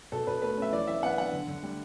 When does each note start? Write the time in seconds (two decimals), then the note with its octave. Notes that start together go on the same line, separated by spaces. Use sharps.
0.12 B2 A4
0.27 B2 B4
0.42 A3 B4
0.57 C#4 E5
0.72 E3 D5
0.87 E3 E5
1.03 B3 F#5
1.18 D4 F#5
1.33 D3
1.48 D3
1.63 G3